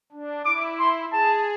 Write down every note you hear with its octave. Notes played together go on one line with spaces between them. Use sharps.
D4
E4 D6
C6
G#4 A5